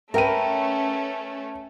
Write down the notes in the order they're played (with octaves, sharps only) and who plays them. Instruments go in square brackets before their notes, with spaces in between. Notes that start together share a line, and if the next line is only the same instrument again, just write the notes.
[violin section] A3 C#4 [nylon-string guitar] A#4 B4 [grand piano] E5 G5 D#7